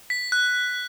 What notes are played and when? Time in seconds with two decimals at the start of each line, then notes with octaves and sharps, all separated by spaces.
0.10 B6
0.32 F#6